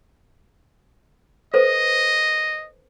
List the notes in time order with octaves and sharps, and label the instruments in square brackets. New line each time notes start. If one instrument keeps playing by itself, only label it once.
[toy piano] A4 B4 C5 [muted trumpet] D#5